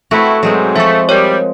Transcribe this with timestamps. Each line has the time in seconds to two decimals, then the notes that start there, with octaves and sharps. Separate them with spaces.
0.11 A3 B3 C4 E4 F#4
0.43 G#2 B2 F#3 G#3 C4
0.76 F3 A3 E5 C#6
1.09 G3 A#4 C#5